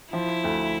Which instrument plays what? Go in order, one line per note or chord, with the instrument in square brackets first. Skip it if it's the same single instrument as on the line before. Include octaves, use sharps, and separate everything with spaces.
[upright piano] F3 [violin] E4
[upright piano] D2